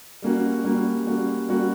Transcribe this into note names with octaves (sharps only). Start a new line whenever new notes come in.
G3 A#3 C#4 F#4
G3 A#3 C#4 F#4
G3 A#3 C#4 F#4
G3 A#3 C#4 F#4